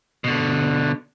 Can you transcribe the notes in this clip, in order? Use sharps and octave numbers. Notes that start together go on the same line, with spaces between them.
B2 D3